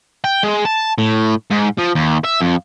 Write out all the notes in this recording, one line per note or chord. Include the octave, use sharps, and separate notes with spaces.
G5
G#3
A5
A2
G#2
F3
D#2
E5
F2